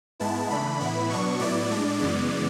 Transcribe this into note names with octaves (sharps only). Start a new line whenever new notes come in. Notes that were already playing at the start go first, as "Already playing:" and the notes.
G#2 G#3 B3 E4 A5
C#3 E3 A3 D4 B5
A2 E3 B3 E4
B2 F#3 B3 D4 C#6
A2 F#3 B3 E4 D5
A2 G#3 D4
F#2 C#3 E3 G#3 B3 D5